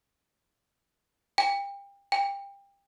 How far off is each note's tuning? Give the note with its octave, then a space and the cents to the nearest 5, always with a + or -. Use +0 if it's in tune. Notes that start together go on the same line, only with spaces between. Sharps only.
G5 +30
G5 +25